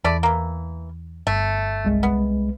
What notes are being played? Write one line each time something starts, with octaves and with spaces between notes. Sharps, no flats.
E2 A3 D5 B5
E3 A#3
G1 A3
C2 G#3
B3